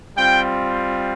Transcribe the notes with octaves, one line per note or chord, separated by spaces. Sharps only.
G3 C4 F4 G5